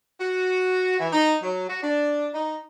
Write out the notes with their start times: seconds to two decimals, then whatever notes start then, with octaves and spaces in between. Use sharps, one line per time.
0.20 F#4
1.00 E3
1.13 D#4
1.43 F#3
1.69 F#4
1.82 D4
2.34 D#4